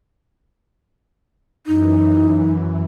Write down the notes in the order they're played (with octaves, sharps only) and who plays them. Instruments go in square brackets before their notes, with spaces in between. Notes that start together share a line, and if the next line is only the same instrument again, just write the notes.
[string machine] F#2 E3 [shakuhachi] D#4